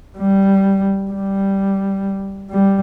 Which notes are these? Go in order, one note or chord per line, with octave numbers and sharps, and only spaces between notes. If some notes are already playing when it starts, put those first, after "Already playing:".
G3
G3
G3